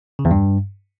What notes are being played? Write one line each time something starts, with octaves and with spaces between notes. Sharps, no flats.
C#3
E2
G2